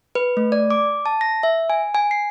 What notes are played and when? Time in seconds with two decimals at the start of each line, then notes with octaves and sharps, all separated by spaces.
0.15 B4
0.37 A3
0.52 D5
0.70 D6
1.06 A5
1.21 A#6
1.43 E5
1.70 G#5
1.95 G#5
2.11 C7